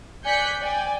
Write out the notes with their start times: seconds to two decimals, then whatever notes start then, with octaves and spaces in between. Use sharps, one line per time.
0.24 D5 G#5 F#6 G6 B6 C#7
0.60 D5 G5 G#5